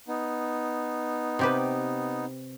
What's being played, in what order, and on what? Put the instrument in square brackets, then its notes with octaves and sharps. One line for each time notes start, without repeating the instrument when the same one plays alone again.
[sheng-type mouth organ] B3 D#4
[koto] C3 G4 B4